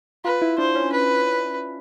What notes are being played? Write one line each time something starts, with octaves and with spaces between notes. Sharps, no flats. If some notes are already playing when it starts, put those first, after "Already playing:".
F4 B4
E4
D4 C5
C#4
B4